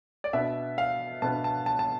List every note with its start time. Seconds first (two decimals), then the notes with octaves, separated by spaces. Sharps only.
0.24 D5
0.33 B2 B3 D4 E5
0.78 F5
1.22 B2 B3 D4 A5
1.44 A5
1.66 A5
1.79 A5